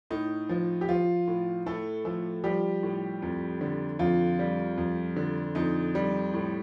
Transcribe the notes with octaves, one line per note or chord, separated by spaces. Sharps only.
A2 D#4
F3
G4
F3 F4
A2
A2 A3 A4
F3 A3 A4
F3 G3 G4
A2
F2
D3
F2 F3 F4
G3
F2
D3
F2 D#4
G3
A2